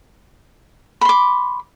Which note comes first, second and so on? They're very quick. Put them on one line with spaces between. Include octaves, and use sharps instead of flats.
B5 C6 D6